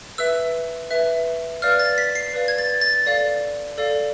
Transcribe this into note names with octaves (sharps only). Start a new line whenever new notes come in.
B4 E5 E6
B4 E5
B4 D5 F5 F6
A6
B6
C7
B4 D5 F5
G#6
A6
A6
A4 D5 F5
A4 D5 F5